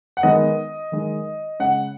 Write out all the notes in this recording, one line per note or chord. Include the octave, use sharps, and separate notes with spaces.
F#5
D#3 G#3 B3 D#4 D#5
D#3 G#3 D#4
C#3 G#3 C#4 F#5